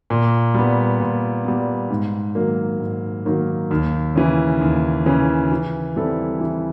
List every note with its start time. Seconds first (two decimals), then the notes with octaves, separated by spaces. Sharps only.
0.10 A#2
0.54 G3 B3
1.00 A#2
1.45 G3 B3
1.90 G#2
2.35 D#3 F#3 A#3
2.80 G#2
3.26 D#3 F#3 A#3
3.71 D#2
4.16 C#3 E3
4.61 D#2
5.06 C#3 E3
5.51 E3
5.96 G3 C4 E4 A4
6.40 E3